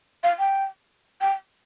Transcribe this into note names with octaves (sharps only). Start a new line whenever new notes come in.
F5
G5
G5